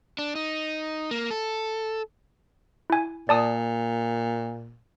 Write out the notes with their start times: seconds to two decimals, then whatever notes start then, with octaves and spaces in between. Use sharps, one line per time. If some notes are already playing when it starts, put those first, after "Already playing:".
0.19 D4
0.35 D#4
1.11 A#3
1.31 A4
2.90 E4 G#5
3.29 A#2 D5 A5 D#6